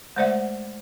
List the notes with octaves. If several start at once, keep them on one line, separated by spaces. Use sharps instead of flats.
G#3 A3 C5 D5 E5 F#5